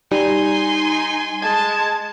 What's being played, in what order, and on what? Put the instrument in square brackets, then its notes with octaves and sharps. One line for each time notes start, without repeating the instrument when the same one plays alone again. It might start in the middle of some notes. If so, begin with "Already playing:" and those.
[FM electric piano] G3 [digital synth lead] D#4 [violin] G#5 C6
[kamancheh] G#3 A5 [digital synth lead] G#6